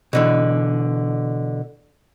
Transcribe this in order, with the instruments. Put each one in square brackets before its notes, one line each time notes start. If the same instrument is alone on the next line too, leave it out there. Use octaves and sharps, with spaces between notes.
[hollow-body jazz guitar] B2 D3 E3